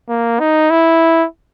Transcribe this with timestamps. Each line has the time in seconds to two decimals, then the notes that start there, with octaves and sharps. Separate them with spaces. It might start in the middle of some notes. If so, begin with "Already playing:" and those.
0.09 A#3
0.40 D#4
0.71 E4